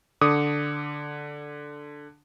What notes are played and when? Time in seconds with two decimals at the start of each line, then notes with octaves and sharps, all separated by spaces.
0.21 D3 D6 D#6